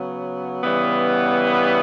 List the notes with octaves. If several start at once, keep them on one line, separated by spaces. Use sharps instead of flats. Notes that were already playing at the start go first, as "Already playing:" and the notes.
Already playing: C#3 F#3 B3
C#3 E3 G3 B3
B4